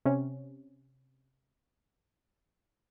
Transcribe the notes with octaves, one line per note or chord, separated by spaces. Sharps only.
C3 C#4